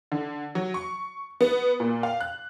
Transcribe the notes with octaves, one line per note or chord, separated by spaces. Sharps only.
D3
F#3
C#6
B3
A#2
F5
F#6